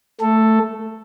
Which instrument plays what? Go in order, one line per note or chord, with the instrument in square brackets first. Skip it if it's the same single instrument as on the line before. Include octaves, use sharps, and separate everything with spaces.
[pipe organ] A3 A4